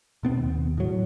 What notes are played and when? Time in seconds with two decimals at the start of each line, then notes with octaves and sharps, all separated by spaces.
0.23 B2 B3 C4
0.38 D#2
0.78 A2 F#3